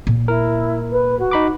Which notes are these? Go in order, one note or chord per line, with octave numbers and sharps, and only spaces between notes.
A#2
E4 A#4
B4
F#4
D#4 B5 D6